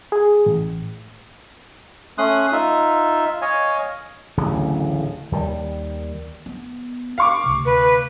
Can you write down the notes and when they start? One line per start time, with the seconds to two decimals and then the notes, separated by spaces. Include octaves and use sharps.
0.12 G#4
0.46 A1
2.18 A3 C#4 C6 D#6 F#6
2.52 D#4 F4 E5
3.42 C#5 D#5 F5 G#5
4.37 D1 A1 D2 C#3
5.32 D#2 D#3 G3
6.46 B3
7.18 D4 F5 C#6 D6
7.44 D2 C3
7.65 B4